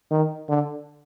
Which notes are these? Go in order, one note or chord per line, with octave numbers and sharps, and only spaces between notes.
D#3
D3